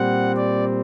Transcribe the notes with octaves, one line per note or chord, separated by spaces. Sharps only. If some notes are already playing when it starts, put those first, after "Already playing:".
Already playing: A#2 G3 C4 F#5
D5